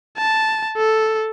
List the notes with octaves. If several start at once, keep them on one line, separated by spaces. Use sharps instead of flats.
A5
A4